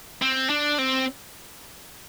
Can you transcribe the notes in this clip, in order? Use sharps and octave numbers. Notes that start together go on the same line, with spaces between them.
C4
D4
C4